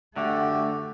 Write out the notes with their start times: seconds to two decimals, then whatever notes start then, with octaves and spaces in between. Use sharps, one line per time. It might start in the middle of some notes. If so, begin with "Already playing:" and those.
0.16 D3 A3 F#4 G4 E5